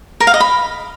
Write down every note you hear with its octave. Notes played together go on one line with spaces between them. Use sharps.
A#4
F5
D#5
B5